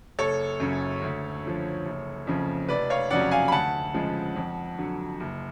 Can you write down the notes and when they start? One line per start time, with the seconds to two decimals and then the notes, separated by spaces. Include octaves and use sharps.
0.19 F#1 A4 C#5
0.60 F#2 C#3
1.02 D2
1.44 D3 F3
1.86 F#1
2.27 F2 C#3 F3
2.69 F1 B4 D5
2.90 C#5 F5
3.10 F2 C#3 F#3 D5 F#5
3.31 F5 G#5
3.48 B5
3.52 D2 F#5 A5
3.94 C#3 F3 G#3
4.36 F2
4.78 D3 F#3
5.20 F#1